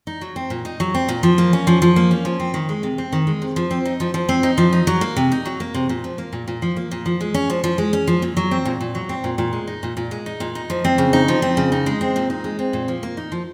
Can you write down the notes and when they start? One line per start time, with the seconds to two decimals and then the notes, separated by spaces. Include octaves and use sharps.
0.07 D#4
0.21 F#3
0.36 C4
0.50 A#2
0.65 D#4
0.80 F#3
0.95 C4
1.09 A#2
1.23 F3
1.38 A#3
1.53 C#4
1.67 F3
1.82 F3
1.96 A#3
2.11 C#4
2.25 F3
2.40 C4
2.54 D#3
2.69 G#3
2.83 C3
2.98 C4
3.12 D#3
3.27 G#3
3.42 C3
3.56 F3
3.71 C4
3.85 D#4
4.00 F3
4.14 F3
4.29 C4
4.43 D#4
4.58 F3
4.73 D#4
4.87 F#3
5.01 A#3
5.17 C3
5.32 D#4
5.45 F#3
5.60 A#3
5.74 C3
5.89 A#2
6.04 F3
6.18 A#3
6.33 A#2
6.48 A#2
6.62 F3
6.77 A#3
6.91 A#2
7.06 F3
7.21 G#3
7.34 C#4
7.50 F3
7.64 F3
7.78 G#3
7.93 C#4
8.07 F3
8.22 A#2
8.37 F#3
8.51 C4
8.65 A#2
8.81 A#2
8.95 F#3
9.09 C4
9.24 A#2
9.38 A#2
9.53 G#3
9.67 D#4
9.83 A#2
9.97 A#2
10.11 G#3
10.26 D#4
10.40 A#2
10.55 D#4
10.70 F3
10.85 C4
10.98 C#3
11.13 D#4
11.28 F3
11.42 C4
11.57 C#3
11.72 D#4
11.86 G#3
12.01 C4
12.16 A#2
12.30 D#4
12.44 G#3
12.59 C4
12.73 A#2
12.88 F3
13.03 A#3
13.17 D#4
13.32 F3